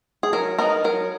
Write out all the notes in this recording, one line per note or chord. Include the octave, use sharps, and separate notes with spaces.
G#4
F#3 A#4
B3 D#4 A#4
F#3 A#4